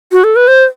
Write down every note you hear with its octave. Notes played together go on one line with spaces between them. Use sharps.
F#4
A4
B4
C5